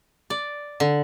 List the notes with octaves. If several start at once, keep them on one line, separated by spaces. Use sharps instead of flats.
D5
D3